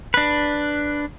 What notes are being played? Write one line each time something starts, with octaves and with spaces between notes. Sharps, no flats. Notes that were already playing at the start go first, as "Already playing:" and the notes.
D4 B4